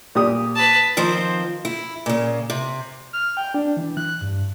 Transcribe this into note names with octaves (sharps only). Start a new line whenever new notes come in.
A#2 G4 D#6
B4 A5
D#3 F3 C4 C5
E4
A#2 C#3
C3
F6
G5
D4
E3
F#6
G2